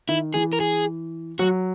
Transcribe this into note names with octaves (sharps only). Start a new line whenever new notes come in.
D#3 E4
E3 G#4
A#4
G#4
F#3 F#4